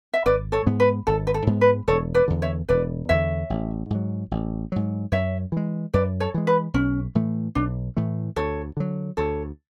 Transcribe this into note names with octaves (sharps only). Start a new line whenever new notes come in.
E5
G#1 B4 D5
A4 C#5
G#2 G#3 B3
B4
G#1 A4
B4
A4
G#2 G#3 B3
B4
E1 A4 C#5
B4 D5
E2 D3
C#5 E5
E1 B4 D5
E2 D3 C#5 E5
A1
G#2 F#3
A1
G#2 F#3
F#2 C#5 E5
E3 G#3
F#2 B4 D5
A4 C#5
E3 G#3
B4
B1 C#4
A2 E3 A3
B1 D4
A2 E3 A3
D2 A4 C#5
D3 F#3
D2 A4 C#5